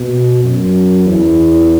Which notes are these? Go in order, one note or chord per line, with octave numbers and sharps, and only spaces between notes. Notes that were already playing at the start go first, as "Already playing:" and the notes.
Already playing: B2
F#2
E2